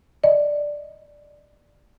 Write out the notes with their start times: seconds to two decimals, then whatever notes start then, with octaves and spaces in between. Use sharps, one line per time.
0.24 D5 D#5